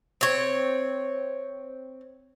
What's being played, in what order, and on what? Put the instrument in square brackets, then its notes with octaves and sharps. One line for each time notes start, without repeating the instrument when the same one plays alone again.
[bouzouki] C4 C#5